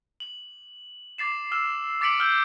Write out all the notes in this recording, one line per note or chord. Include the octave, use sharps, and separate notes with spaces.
F#7
D6 A6 C7 E7
E6 F6 E7
D6 A6 B6 C#7 D7 F#7
E6 F6 G6 G7